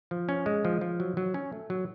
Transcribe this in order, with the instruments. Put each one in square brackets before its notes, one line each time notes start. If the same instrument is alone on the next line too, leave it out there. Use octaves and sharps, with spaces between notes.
[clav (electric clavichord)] F3
C#4
G#3
F3
F3
F#3
F#3
C#4
A3
F#3